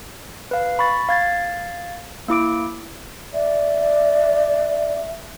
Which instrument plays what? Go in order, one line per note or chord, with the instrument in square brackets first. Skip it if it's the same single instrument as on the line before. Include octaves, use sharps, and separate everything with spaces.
[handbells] B4 F5
B5 C#6 A6
F5 G#6 A6
A#3 E4 D6 D7
[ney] D5 [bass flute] E5